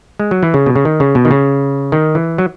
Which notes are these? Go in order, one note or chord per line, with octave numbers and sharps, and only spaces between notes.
G#3
F#3
E3
C#3
B2
C#3
D#3
C#3
B2
D#3
C#3
D#3
E3
F#3